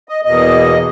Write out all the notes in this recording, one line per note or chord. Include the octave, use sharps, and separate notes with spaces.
D#5
E2 B2 A#3 D#5